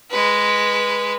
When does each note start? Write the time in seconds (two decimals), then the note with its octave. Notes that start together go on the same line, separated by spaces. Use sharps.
0.11 G#3 B4